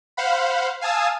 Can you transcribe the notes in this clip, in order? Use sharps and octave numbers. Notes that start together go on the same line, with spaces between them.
C5 F5 F#5 B5
F5 G#5 A5 D#6 E6